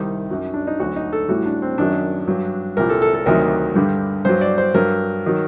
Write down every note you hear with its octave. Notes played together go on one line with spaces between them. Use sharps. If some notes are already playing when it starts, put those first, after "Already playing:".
Already playing: C2 C3 D#3 G3 D#4
F#2 F#3
D4
D#4
D2 D3 F#3 F#4
D#4
A4
A1 A2 G3 F#4
D4
C4
F#2 D#3 F#3 D4
G2 F#3
C2 A#2 G3 A#4
A4
A4
A4
D2 C3 D#3 F#3 A#4
G2 D3 G3
G2 F#3 C5
D5
C5
G2 F#3 A#4
D#3 F#3